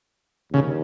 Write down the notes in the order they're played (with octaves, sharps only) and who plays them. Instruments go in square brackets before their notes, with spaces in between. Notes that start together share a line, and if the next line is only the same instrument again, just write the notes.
[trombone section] D#2 [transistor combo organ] C#3